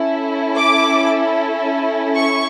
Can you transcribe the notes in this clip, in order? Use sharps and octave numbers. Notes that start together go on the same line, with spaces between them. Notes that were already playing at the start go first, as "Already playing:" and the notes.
Already playing: C#4 E4 A4
D6
C#6